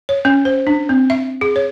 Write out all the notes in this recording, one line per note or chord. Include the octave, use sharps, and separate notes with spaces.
C#5
C#4
C5
D4
C4
E5
G#4
C#5